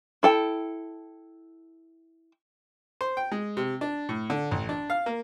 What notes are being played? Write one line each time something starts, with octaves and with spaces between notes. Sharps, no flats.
E4 A4 G5
C5
G5
G#3
C3
D4
A2
D3
A1
D4
F5
A#3